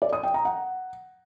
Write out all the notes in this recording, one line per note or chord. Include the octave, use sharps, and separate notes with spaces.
D5
D#6
G5
A#5
F#5